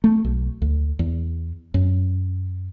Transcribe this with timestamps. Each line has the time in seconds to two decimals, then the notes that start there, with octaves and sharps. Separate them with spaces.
0.04 A3
0.25 B1
0.62 D2
0.99 E2
1.74 F#2